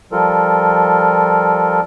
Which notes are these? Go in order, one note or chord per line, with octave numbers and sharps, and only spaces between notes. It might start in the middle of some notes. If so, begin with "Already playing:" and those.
F3 G3 F4 A4 A#4